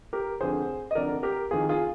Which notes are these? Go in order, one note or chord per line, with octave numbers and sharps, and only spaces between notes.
G4 A#4
F1 F2 D3 G#4 C5
D#5
F1 F2 D3 A#4 D5
G4 A#4
F1 F2 D#3 F4 G#4
F4 G#4